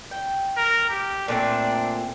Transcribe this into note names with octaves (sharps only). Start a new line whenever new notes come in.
G5
A#4
G4
A#2 A3 C4 D4